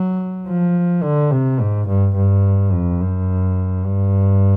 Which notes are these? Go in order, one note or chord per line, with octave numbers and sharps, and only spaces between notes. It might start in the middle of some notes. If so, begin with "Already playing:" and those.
Already playing: F#3
F3
D3
C3
G#2
G2
G2
F2
F#2
G2